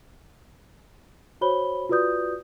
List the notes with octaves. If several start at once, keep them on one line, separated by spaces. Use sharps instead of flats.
F#4 C5 C#5 B5 G7
F4 F#4 B4 D5 D#6 G6